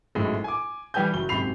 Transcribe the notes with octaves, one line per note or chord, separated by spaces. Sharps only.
G#1 F#2 A2 G#3 E4
G#5 D6
E3 G3 G4 B4 G#5 G6
F#1 F#3 G7
G#1 F#2 C3 B5 C7 F7